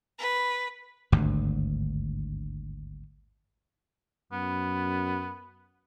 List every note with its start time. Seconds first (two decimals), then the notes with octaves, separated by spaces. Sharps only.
0.17 B4
1.12 G#1 D2 G2
4.32 F#2 B3